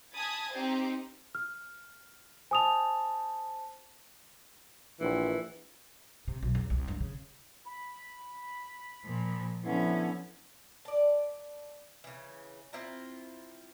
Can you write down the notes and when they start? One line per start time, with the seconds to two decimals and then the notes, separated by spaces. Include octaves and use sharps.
0.13 G#5 A5 B5 D#6 G#6 A6
0.52 C4 D#4 G4 C5
1.35 F6
2.51 C5 G#5 A5 D#6 F7
5.00 A#1 E3
6.28 C3
6.43 B1
6.55 E2
6.70 C2
6.88 G2
7.00 C#3
7.66 B5
9.05 A#2 F3
9.64 D3 F3 B3 C#4 E4
10.85 D5 A5
12.04 C#3 E3
12.73 C4 E4 F4 A#5